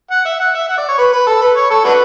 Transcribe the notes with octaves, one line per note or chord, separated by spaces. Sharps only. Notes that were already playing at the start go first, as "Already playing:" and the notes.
F#5
E5
F#5
E5
F#5
D5
C#5
B4
B4
A4
B4
C#5
A4
D4 F#4 B4